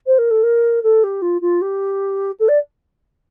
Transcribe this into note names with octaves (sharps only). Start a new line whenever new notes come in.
C5
A#4
A4
A#4
A4
G4
F4
F4
G4
A4
D5